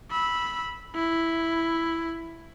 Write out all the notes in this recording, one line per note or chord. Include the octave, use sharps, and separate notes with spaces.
B5 E6
E4